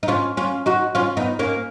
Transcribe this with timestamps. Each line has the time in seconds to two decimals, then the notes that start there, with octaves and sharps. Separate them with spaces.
0.03 D#4
0.08 C#4 F4
0.37 C#4 F4
0.66 D#4 F#4
0.95 C#4 F4
1.17 B3 D#4
1.39 A#3 C#4